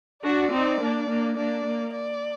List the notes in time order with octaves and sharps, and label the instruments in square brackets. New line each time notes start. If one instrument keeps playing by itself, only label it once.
[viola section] D4 F#4 [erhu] D5
[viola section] C4 D#4
A#3 D4
A#3 D4
[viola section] A#3 D4 [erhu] D5
[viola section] A#3
[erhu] D5